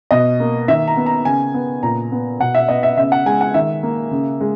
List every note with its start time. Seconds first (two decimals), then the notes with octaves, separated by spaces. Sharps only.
0.11 B2 D#5
0.40 A#3
0.68 D#3 E5
0.88 A#5
0.97 B3
1.06 A#5
1.25 C#3 G#5
1.54 B3
1.83 A#2 A#5
2.12 B3
2.40 B2 F#5
2.55 E5
2.69 B3 D#5
2.83 E5
2.97 C#3 E5
3.12 F#5
3.26 G#3 G#5
3.41 F#5
3.54 D#3 E5
3.83 A#3
4.11 C#3
4.41 G#3